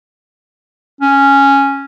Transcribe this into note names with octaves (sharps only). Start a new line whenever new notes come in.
C#4